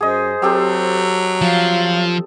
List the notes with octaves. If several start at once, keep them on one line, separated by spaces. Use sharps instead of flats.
F#2 G#4 C5 D#5
F#3 C4 G4 A4
F3 F5